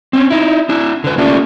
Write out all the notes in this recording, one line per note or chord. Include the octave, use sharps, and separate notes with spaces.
C4 C#4
D#4 E4
D4 E4
D3 B4
A3 A#3 C#4 D4 F4